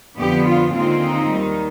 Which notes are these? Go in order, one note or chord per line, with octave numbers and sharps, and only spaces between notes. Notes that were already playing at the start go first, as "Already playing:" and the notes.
F2 D3 F3 B3 D4 G4
F4
D#2 D3 G#3 C4 D#4 F4
D#4
D#2 D#3 G3